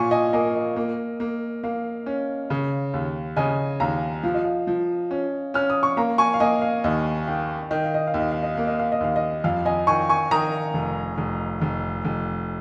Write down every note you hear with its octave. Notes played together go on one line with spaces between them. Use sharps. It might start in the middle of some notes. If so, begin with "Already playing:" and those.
Already playing: A#2 F5 G#5 C#6
D#5 G#5
A#3 D#5 G#5
D#5
A#3
A#3
A#3 F5
C#4
C#3
D#2
C#3 D#5 G#5
D#2 F5 A#5
F3 F5
D#5
F5
F3
C#4
C#4 F6
D#6
C#6
A#3 F5 A#5
G#5 C#6
F5
A#3 D#5 G#5
F5
D#2 D#5
D#3 F5
D#3 D#5
F5
D#5
F5
D#2
D#5
F5
D#5
A#3 F5
D#5
F5
D#5
D#2 F5
D#5
F2 F5
D#5 G#5
D#3 G#5 C#6
G#5 C#6
D#3 A#5 D#6
F1
F1
F1
F1